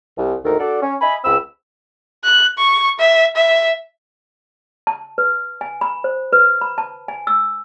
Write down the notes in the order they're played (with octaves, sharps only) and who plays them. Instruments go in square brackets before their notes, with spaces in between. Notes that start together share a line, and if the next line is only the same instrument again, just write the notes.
[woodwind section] C2
D2 G#2 D#3 A4 A#4
D4 F#4 A4 D5
C#4
D#5 E5 G#5 B5
C#2 C4 B5 E6
[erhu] F#6
C#6
E5
E5
[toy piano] A5
B4
G#5
B5
C5
B4
B5
A5
G#5
E6